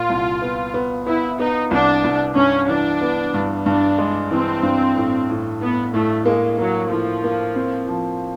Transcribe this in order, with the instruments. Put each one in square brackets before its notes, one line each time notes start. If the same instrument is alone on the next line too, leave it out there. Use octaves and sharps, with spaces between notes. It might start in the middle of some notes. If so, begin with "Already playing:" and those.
Already playing: [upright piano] A#2 [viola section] F4
[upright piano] C2
B3
B3
[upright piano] B3 [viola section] E4
[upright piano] B3 [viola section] D#4
[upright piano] C2 [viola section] D4
[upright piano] C2
[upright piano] G2 [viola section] C#4
[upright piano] E3 [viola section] D4
[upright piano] B3
G2
[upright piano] G2 [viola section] D4
[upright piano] G#3
[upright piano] E3 [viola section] C4
[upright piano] G2
A2
A2
[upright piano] A2 [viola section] B3
[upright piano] A2 [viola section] A3
[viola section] G#3 [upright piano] A#3
[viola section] F#3 [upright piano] A#3
[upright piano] A2 [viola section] F3
[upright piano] A#3
C4
F3